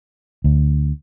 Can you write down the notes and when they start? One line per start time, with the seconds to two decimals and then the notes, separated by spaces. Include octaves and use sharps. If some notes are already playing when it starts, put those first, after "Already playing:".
0.44 D2